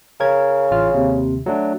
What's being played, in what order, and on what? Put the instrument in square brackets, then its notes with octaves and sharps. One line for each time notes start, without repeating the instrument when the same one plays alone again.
[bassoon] C#3 [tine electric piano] A#4 G#6
[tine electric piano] A1 F4 F6
D#2 C3
F#3 A3 D4